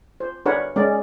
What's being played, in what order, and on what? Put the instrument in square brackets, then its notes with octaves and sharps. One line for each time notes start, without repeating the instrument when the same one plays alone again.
[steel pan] C5
D4 A#4 B4 C#5 F#5
G#3 C#4 A#4 D5